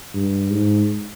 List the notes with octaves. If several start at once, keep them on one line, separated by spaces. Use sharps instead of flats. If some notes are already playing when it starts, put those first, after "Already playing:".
G2
G#2